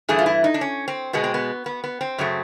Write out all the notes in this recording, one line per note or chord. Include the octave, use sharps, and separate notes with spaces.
G2 E3 A3 G#4
F4
E4
D#4
D4
C#4
C4
B2 G#3 B3
C4
B3
B3
B3
C4
F#2 C#3 F#3 A3